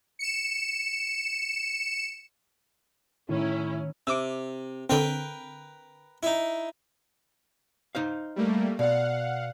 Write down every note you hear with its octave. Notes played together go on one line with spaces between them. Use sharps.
C#7 E7
A2 D#3 C#4 E4
C3 D6 E6
D3 C4 A#4 B4 G5
D#4 E4
D#4 C5 F5
G3 A3 A#3
B2 D5 F5 F#5